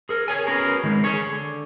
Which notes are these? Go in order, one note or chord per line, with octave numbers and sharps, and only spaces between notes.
G#4 A#4
G#4 C#5 G#5
B3 C#4 F#4 G#4 A#4
D#3 G#3
G#4 C#5
D3